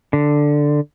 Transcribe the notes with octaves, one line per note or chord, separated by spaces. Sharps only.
D3